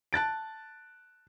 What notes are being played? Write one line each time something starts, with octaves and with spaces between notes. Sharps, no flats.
A5 F#6 A6 D7